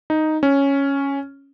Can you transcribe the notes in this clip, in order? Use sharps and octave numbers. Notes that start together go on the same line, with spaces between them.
D#4
C#4